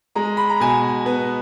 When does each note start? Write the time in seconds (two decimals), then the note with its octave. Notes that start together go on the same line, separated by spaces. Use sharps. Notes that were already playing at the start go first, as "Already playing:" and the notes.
0.15 G#3 A#5
0.37 B5
0.50 A#5
0.60 B2 G#5
1.06 B3